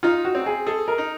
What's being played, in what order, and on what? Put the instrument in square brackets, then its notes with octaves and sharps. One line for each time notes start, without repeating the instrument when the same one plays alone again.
[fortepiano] D#4 [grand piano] F4
[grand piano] F#4
[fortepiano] C4
[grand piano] G#4
[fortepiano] G#4 [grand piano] A4
[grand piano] A#4
[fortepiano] D#4